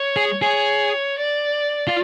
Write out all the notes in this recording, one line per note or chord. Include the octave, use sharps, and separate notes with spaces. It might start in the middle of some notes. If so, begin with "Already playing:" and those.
Already playing: C#5
G#4
G#4 C#5
D5
F4